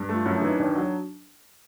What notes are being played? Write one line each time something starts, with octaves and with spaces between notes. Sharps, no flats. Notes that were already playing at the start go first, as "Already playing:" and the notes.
Already playing: G2
A3
F4
F#2 E4
D4
E3 D#4
D#2 D4
F#3